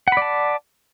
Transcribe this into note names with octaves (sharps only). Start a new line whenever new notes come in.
D5 F#5 A5 B5